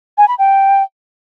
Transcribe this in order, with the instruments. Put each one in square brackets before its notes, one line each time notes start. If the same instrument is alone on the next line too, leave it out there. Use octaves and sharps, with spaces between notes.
[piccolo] G#5
B5
G5